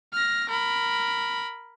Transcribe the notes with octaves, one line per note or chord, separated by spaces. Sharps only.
F6 A#6
A#4 B5